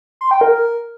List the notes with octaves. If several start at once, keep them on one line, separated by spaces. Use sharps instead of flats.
C6
G5
A#4
A#4